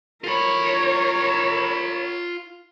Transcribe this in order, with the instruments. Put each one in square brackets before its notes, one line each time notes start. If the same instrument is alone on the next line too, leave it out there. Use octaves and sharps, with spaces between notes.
[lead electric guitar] F4 B5 [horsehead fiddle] A#4 C#5